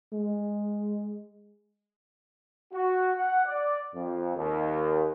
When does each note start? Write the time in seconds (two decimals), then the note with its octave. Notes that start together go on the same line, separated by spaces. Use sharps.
0.13 G#3
2.74 F#4
3.16 F#5
3.46 D5
3.94 F2
4.36 D#2